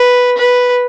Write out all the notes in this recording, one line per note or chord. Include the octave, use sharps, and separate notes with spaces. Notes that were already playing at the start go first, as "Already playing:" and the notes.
Already playing: B4
B4